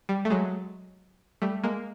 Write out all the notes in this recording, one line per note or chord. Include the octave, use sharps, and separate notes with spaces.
G3
A3
F#3 G#3
G3 A3
G#3 A#3